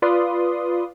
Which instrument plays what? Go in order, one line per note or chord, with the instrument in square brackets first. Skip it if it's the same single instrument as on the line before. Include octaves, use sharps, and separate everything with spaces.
[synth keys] F4 B4 D5 C6 D#6